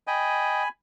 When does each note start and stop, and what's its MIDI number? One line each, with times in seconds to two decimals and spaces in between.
0.07 0.63 75
0.07 0.63 79
0.07 0.68 80
0.07 0.68 83